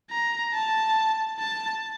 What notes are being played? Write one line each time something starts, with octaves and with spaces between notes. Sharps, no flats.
A#5
A5
A5